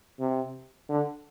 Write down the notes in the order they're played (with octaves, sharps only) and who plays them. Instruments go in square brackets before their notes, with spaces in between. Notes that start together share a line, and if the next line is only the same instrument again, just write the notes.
[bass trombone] C3
D3